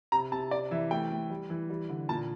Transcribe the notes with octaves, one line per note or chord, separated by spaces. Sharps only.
C3 A#5
C3 A5
C3 D5
E3 E5
A3 G5
A3
G3
E3
G3
D3
A#2 A5